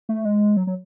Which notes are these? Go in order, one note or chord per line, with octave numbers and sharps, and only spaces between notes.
A3
G#3
F#3
F#3